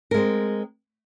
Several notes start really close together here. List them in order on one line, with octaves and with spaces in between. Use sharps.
A#4 G#3 C4